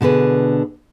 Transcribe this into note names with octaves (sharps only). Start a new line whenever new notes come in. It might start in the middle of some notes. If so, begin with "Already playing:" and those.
B2 D3 G#4 B4